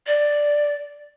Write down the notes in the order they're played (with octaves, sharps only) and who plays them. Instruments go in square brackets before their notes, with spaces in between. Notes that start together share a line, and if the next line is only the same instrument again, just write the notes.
[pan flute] D5